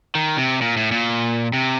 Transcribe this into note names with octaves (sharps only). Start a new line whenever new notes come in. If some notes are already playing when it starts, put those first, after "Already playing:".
D#3
C3
A#2
A2
A#2
C3